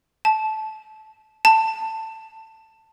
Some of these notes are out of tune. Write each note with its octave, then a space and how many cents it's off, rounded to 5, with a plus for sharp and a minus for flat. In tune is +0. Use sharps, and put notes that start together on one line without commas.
A5 -20
A5 +15